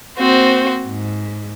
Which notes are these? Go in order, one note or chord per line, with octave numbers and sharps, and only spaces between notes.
A#3 C4 F#4 C5
G#2